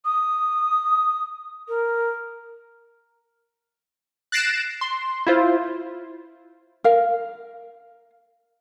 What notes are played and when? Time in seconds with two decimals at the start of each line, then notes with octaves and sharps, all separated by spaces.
0.05 D#6
1.69 A#4
4.32 F#6 A6 A#6 C7 D7 E7
4.81 C6
5.27 E4 F4 C5
6.84 A#4 F5